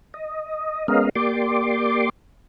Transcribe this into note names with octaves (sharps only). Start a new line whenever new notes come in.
D#5
G#3 B3 C#4 A#4 D#5 F5
A#3 G4 D5 C6 D6